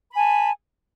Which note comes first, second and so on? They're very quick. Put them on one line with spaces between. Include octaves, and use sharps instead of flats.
B5 G#5 A5